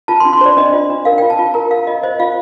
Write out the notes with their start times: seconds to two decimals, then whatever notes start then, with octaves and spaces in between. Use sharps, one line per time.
0.08 F4 A5
0.20 C6
0.25 D4
0.33 C6
0.41 C5 D5
0.57 D4 D#5
0.73 F4
0.90 D4
1.05 A#4 F5
1.18 G5
1.23 F4
1.30 A5
1.39 F4
1.54 A#4 A#5
1.71 A#4 F5
1.87 F4 D#5
2.03 C5 D#5
2.20 F4 F5